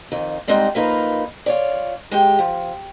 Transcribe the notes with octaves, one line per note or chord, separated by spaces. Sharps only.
F2 D#3
G#2 G3 G#3 C4 D#4 D#5
F3 A#3 D#4 B4
F4 C#5 D5
G#3 G4 G5
F3